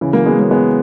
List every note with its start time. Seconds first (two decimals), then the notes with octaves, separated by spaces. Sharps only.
0.01 C#3 E3
0.13 F#3 A#3
0.26 G#3 B3
0.39 A#3 C#4
0.51 G#3 B3